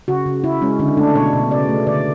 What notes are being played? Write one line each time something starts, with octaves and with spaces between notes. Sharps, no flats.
C#3 F#4
C#3
C#3 E4
G#3 C#4
D3 C#4
A3 D4
B2 C#5
B2
C#3 D5
A3
D3 D5